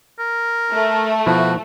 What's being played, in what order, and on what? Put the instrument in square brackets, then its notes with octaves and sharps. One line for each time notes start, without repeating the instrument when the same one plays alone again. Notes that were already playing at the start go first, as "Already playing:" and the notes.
[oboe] A#4
[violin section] A3
[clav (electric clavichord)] B2 F3 E4 [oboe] F#4